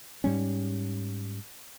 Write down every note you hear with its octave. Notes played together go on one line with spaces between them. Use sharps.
G#2 G3 C#4